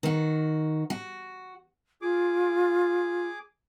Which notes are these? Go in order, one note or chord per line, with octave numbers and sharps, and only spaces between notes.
D#3 F#4
F#4
F4 G#4 D6